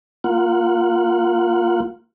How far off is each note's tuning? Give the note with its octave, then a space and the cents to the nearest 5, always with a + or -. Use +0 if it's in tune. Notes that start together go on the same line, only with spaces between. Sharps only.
A#3 +0 F4 +0 F#5 +0